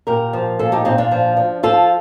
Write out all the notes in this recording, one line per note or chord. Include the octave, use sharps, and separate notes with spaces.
A#2 G4 A#4
F3
A#2 F4 A4
D#4 G4
A#2 C4 D#4
D4 F4
F3
F3
F3 F4 A4